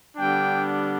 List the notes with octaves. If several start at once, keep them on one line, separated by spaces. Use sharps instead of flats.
D3 G3 B3 D4 G5